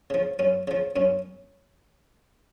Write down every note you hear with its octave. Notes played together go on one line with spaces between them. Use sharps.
C#3 F3
F#2 C#4
C#3 F3
F#2 C#4